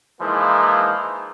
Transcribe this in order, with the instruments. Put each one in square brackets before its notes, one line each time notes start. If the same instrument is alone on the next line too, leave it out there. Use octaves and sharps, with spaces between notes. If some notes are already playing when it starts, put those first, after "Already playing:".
[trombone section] E3 F3 G#3 A#3 D#4 E4